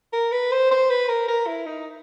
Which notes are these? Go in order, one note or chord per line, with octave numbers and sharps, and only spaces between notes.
A#4
B4
C5
C5
B4
A#4
A#4
E4
D#4